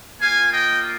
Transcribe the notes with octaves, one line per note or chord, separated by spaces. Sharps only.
A#3 F4 F5 G#5
D#5 G5